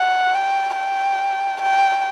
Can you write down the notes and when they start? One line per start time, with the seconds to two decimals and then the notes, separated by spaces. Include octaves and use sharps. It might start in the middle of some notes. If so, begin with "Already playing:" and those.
Already playing: F#5
0.34 G5
0.76 G5
1.62 G5